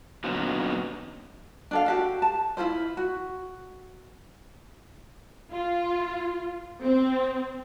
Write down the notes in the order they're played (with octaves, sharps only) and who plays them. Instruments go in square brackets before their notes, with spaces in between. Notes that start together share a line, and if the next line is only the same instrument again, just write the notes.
[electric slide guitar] A#2 D3 F#3 B3 C#4 D#4
[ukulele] D4 A4 F5
F#4 G4 A4
A5
E4 F4 G#4 C5
F#4
[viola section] F4
C4